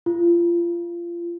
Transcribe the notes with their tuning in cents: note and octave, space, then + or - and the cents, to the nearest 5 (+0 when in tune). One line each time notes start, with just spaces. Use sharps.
F4 -25